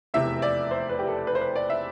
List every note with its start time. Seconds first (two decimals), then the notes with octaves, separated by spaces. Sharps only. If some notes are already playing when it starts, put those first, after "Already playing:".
0.14 F1 E2 C3 E5
0.42 D5
0.71 C5
0.89 B4
0.99 G4
1.08 A4
1.27 B4
1.35 C5
1.41 B4
1.56 D5
1.70 E5